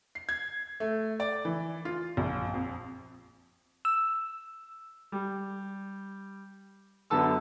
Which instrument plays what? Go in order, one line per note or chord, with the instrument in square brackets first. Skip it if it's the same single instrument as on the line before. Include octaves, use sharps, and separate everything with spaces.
[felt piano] C7
G#6
A3
D5
E3
F4
A#1
F2
[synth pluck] E6
[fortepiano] G3
F#2 D3 B3 A5 E6